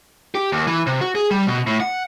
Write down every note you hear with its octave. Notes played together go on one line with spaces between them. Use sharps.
G4
D#2
E3
C3
F#4
G#4
G3
B2
A2
F#5